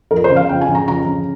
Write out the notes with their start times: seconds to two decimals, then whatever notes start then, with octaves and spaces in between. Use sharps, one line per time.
0.11 F2 A#4
0.24 C5
0.30 C#3
0.36 F5
0.49 F2 G5
0.61 G#5
0.69 C#3
0.75 A#5
0.87 F2 A#5
1.06 C#3